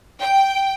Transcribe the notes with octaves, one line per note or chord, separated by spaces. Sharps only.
G5